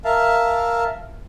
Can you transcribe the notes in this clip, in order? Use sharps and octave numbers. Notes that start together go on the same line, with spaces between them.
A#4 E5 F5 A5